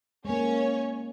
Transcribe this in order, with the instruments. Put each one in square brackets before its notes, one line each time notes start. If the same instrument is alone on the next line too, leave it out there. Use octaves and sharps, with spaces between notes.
[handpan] G#3 A#3 [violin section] C#4 C#5